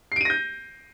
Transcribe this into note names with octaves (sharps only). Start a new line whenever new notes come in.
G6 A#6 C7 D7 D#7